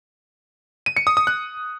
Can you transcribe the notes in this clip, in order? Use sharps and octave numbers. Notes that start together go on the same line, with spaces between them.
D#7
C#7
D#6
D#6
F#6